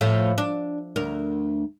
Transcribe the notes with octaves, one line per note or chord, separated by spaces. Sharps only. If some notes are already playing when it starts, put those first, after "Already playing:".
A2 F3 A3
D4
D2 A#4